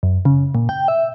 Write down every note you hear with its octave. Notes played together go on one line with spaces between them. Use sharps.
F#2
C#3
A#2
G5
E5